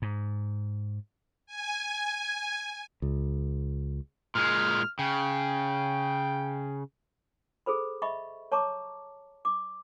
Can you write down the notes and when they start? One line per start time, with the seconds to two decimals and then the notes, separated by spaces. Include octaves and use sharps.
0.02 G#2
1.46 G#5
3.02 C#2
4.35 A#2 G#3 F6
4.99 C#3 G5
7.66 G#4 A4 C5 B5
8.02 D#5 E5 B5 C#6
8.52 C#5 A5 A#5 C#6 D6
9.45 D6